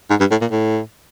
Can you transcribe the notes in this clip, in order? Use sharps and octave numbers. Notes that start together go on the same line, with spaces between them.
G#2
G2
A2
A#2
A2